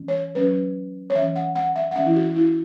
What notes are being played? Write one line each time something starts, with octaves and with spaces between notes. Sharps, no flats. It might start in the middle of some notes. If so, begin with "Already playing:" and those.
Already playing: E3 C#4
C#5
F#3 C#4 B4
C#5
E3 C#4 E5
F#5
F#5
E5
F#5
E3 C#4 E5
E4
F#4
E4